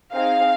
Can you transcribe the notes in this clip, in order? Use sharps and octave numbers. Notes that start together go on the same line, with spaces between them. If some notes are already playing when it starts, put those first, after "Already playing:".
C4 D#4 G#4 F5